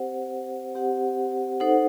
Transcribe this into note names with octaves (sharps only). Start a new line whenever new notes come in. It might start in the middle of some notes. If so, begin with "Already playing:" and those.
Already playing: C4 G4 C5 F#5
C4 G4 C5 F#5
D#4 A4 C5 F#5